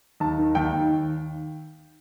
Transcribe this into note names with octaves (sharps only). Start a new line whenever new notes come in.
D#2 A5
D#3
D#2 G5
D#2